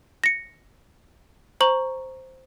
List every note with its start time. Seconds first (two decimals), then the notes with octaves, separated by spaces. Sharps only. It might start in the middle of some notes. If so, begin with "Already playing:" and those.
0.24 A#6 C#7
1.61 C5 A#5 C#6 F#7